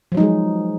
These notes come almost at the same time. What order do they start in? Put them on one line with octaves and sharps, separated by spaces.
F3 F#3 D#4 G#3 G#4